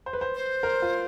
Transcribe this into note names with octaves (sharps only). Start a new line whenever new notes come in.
C5
B4
C5
C5
A#4
F4